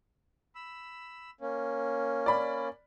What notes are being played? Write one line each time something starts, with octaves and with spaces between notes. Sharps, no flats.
B5 E6
A#3 C#4
D5 B5